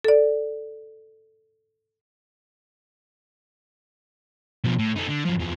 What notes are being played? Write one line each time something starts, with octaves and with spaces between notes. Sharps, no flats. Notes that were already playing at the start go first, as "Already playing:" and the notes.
A4 D5
B2 F3
A2
A3 D#4
D3
F#2 F3
E2 F3